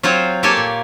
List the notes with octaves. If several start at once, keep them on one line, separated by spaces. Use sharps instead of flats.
F#3 C4 F4 C5 C#5
A#3 G4 A4 C#5 G#5 A5
A#2